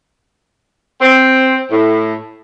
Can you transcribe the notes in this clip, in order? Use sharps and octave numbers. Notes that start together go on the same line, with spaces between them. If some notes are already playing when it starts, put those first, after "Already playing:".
C4
A2